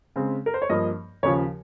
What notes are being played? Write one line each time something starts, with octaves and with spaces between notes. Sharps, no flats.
C#3 G#3 C4
A#4
C5
C#5
G2 F3 A#3 D#5
D#2 C#3 F3 C#5